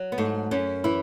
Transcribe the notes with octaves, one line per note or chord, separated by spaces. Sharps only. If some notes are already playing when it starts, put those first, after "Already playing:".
Already playing: F#3
B3
G#2 A3
F#2 C#4
E3 E4